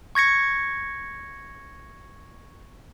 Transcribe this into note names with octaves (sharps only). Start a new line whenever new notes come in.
C#6 G#6 A#6 C#7